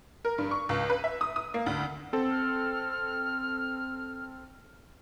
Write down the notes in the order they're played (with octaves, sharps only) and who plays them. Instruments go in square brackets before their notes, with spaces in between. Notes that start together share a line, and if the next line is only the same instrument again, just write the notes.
[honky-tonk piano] A#4
G2
C#6
C#2
B4
E5
D#6
D#6
A#3
D2
[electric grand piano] C4 A4
[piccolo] F6